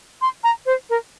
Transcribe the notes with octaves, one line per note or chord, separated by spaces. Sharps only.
C6
A#5
C5
A#4